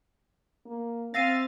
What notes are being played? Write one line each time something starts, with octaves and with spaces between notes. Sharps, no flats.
A#3
C4 E5 F5 A6 A#6 C7 D#7